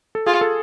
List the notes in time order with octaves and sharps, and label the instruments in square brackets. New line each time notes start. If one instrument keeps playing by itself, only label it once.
[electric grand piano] A4
[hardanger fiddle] F4 [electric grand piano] G#4
[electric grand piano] A4